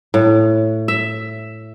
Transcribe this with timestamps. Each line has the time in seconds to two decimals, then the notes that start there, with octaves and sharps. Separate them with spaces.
0.14 A2
0.88 E5